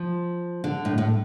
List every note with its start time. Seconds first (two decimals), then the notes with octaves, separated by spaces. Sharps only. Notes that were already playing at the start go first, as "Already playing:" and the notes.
Already playing: F3
0.64 D3
0.85 A2
0.98 A2